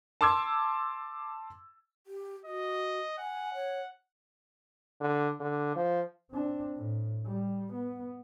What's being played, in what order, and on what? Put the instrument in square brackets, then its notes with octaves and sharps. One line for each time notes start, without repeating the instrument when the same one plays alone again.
[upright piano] A5 C6 D6 E6 G#6
[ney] G4
[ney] F#4 [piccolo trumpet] D#5
[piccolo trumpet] F#5 [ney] G#5
[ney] C#5
[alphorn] D3
D3
F3
[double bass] C4 D4
A2
G3
B3